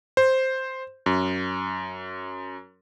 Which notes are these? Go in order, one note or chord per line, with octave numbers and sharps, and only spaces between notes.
C5
F#2